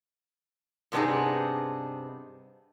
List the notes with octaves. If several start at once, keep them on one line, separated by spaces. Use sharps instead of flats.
G2 C3 B3 D4 D#4 G#4